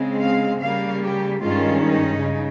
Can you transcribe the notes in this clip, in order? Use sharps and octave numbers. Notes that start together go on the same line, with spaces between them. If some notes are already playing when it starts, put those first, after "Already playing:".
Already playing: C#3 G#3 C4
F5
C#3 G3 A#3 F5
G4
G2 D#3 G#3 C#4 F4
D#4
C#3